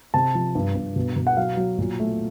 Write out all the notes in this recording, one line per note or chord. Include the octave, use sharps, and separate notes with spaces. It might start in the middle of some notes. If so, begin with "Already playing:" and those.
C3 A5
F3
G2
G2
B2
B2
F#5
F#3 F5
F#3
A#2
A3